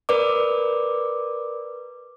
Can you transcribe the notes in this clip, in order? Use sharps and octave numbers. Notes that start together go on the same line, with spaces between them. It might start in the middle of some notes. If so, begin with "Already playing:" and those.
A#4 B4 D5 D6